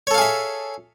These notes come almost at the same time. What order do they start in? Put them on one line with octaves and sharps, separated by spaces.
C#5 A4 F5 G#4 E5